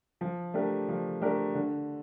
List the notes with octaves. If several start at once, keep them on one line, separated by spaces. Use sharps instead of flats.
F3
A3 D4 G4 A#4
F3
A3 D4 G4 A#4
D3